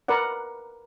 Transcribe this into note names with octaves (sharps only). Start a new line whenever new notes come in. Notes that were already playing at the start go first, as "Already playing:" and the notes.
A#4 B4 D5 F#5